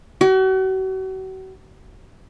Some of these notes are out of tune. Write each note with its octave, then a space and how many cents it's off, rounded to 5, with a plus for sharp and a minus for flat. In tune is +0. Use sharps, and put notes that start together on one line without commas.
F#4 +40